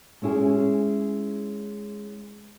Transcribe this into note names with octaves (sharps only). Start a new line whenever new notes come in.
G#3 C#4 E4 G#4